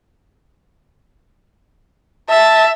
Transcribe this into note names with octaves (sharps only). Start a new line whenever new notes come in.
E5 A5